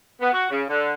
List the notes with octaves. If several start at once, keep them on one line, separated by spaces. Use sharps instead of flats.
B3
F#4
C#3
D3